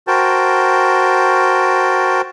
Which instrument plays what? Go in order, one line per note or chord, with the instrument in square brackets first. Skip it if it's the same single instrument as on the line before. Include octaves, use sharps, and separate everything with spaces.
[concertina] F#4 A#4 C5 G5 A5